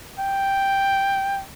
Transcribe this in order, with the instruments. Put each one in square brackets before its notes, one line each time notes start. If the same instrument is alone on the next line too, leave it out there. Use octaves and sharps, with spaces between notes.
[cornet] G5